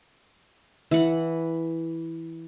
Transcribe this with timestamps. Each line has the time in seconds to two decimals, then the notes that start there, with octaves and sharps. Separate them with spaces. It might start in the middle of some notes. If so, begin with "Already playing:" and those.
0.91 E3 F#5